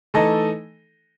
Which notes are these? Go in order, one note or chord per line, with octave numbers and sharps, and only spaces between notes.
E3 A3 D#4 A4 D#5